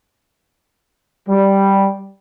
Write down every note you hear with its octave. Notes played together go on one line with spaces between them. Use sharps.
G3